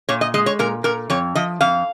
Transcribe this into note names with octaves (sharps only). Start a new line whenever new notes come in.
A#2 C#5
D#5
G#3 D#5
C#5
A#2 A#4
A#2 A#4
F2 C#5
F3 D#5
F2 F5